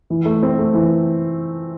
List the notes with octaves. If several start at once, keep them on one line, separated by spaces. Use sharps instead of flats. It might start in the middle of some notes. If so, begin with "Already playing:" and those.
E3
A3
C4
A3
E3